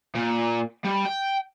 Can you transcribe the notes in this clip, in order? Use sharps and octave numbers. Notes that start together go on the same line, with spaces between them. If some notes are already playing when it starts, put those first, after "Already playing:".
A#2
G3
G5